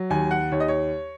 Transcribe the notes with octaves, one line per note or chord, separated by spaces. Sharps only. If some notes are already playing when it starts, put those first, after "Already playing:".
Already playing: F#3
D#2 G#5
F#5
D#2 C#5
D#5
C#5